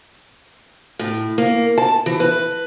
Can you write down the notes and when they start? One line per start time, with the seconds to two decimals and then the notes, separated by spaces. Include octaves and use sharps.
0.99 A2
1.38 A#3
1.78 A5
2.06 E3
2.20 B4